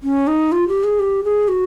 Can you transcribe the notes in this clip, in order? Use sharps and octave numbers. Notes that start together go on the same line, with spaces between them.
C#4
D#4
F4
G4
G#4
G4
G#4
F#4